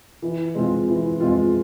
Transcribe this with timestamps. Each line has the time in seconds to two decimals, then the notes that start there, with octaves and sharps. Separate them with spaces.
0.22 E3
0.55 G#3 C4 F4
0.88 E3
1.20 G#3 C4 F4